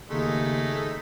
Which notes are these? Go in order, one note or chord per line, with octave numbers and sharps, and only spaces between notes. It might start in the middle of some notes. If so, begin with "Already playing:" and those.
D#2 C#3 G#3 A3 D#4